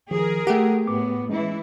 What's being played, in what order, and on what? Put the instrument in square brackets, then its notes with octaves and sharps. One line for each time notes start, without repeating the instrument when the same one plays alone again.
[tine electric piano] D#3 F3 [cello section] G#4 A#4
[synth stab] A3 G4 [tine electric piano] F#5
[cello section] A2 B3 [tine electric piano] D6
[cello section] E3 E4 [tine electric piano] G#3 C#4